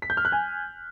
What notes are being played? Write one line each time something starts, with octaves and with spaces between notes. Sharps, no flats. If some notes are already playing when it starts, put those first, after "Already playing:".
B6
G6
F6
F#6
G#5